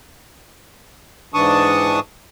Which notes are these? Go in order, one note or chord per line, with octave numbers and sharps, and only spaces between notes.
G#2 E3 D4 A5 C#6 D#6